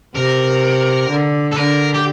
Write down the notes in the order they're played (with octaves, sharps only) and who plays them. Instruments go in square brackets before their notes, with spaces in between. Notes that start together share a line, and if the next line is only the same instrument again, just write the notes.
[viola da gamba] C3 [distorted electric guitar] A#4
[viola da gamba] D3
[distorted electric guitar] A4
[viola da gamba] D3 [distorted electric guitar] A#4
[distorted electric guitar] G4